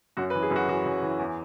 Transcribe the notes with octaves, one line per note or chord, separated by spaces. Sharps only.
F#2 F#4
B4
E3
G#4
F#2
F#4
E3 F#4
F#2
E3
E2